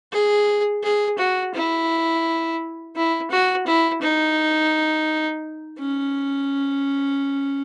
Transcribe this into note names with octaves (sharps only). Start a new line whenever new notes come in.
G#4
G#4
F#4
E4
E4
F#4
E4
D#4
C#4